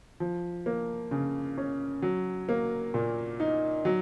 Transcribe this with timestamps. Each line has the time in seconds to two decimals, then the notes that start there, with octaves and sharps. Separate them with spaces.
0.20 F3
0.66 A#3
1.11 C#3
1.58 C#4
2.02 F#3
2.49 A#3
2.94 A#2
3.40 D#4
3.85 F#3